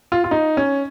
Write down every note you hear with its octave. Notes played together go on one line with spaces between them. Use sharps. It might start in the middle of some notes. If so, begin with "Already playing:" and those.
F4
F4
D#4
C#4